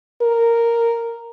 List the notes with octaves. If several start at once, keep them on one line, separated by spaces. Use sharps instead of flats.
A#4